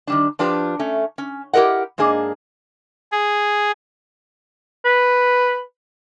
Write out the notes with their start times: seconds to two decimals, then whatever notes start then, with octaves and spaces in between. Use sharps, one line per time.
0.07 D#3 G3 D4
0.39 F3 D4 F4 G4 B4
0.79 A3 C#4
1.18 C#4
1.53 E4 G4 G#4 A#4 D#5 F#5
1.98 G#2 A#3 D4 G#4 D#5
3.12 G#4
4.85 B4